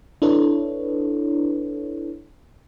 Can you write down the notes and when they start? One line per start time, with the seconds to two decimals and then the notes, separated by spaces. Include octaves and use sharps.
0.22 D4 E4 A4 B4 C#5